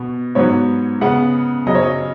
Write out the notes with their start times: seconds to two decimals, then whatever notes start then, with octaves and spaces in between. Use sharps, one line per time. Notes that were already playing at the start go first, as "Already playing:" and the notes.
Already playing: B2 B3
0.35 G#2 F#3 B3 C#5
1.01 C#3 G#3 B3 F#5
1.67 F#2 C#3 F#3 D#5
1.75 C#5
1.82 D#5